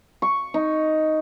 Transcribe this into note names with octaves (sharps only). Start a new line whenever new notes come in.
C#6
D#4